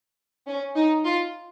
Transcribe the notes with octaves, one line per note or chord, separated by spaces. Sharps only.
C#4
D#4
F4